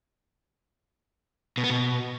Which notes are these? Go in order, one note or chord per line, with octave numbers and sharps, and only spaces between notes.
B2
B3
B2